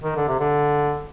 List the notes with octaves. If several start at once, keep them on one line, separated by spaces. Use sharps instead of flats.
D#3
D3
C3
D3